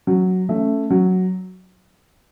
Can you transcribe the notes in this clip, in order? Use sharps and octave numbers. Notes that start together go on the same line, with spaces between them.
F#3
A3 C#4
F#3